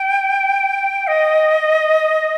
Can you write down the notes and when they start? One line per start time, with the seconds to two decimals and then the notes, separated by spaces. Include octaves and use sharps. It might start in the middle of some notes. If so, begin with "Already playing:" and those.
Already playing: G5
1.07 D#5